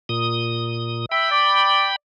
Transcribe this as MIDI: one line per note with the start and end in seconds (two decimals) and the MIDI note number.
0.09 1.05 46
0.09 1.05 87
1.11 1.30 76
1.11 1.96 79
1.11 1.96 83
1.31 1.86 74